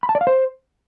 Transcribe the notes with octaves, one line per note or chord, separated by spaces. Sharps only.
B5
A5
D5
F5
C5